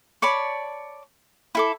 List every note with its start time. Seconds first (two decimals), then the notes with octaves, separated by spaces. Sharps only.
0.22 C#5 D5 A5 B5
1.55 E4 A4 D6